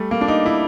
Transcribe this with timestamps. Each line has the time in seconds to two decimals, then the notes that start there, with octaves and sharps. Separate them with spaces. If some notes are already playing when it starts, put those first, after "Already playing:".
Already playing: G3 A3
0.11 A#3
0.21 D4
0.28 D#4
0.46 E4